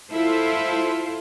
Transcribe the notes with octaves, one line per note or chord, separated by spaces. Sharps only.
E4 F4 A4 C5